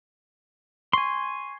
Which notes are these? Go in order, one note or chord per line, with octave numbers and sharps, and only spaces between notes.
G#5 C6 C#6